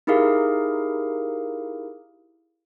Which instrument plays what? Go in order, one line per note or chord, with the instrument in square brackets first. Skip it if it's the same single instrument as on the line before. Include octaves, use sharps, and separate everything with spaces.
[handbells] D#4 E4 G4 G#4 A#4 F5